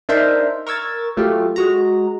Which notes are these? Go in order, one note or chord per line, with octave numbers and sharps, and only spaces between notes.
D4 D#4 A#4 C5 E5 C6
A#4 C#6 E6 G#6 A6
F#3 A3 F4 G4
G#3 F#4 A#5